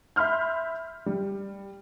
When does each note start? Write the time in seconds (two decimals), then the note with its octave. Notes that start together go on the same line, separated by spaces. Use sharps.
0.16 E5 B5 C6 F6 G6
1.06 G3